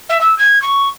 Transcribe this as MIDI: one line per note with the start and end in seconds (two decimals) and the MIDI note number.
0.09 0.20 76
0.21 0.36 88
0.38 0.61 92
0.62 0.88 85